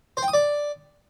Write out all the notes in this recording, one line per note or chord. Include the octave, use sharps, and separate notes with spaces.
C5
G5
D#6
D5